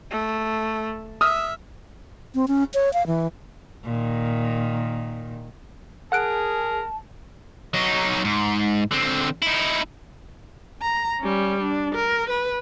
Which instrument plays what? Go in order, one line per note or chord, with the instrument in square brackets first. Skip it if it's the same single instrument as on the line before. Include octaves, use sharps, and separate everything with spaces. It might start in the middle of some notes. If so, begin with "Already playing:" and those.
[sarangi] A3
[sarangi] E5 [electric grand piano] D#6 F6
[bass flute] C4
C#4
C#5
F5
E3
[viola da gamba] A#2 D#3
[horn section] G#4 [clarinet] A#4 [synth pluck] F#5 F#6 D7 [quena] A5
[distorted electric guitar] F#3 D#4
G#2
D3 C4
D#4 E4
[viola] A#5
G3 C#4
D4
A#4
B4